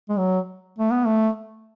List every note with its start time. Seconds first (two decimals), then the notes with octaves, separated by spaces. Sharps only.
0.09 G#3
0.18 F#3
0.79 A3
0.92 B3
1.06 A3